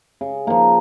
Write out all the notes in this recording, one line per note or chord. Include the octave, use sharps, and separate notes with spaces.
C#3
F3 A#3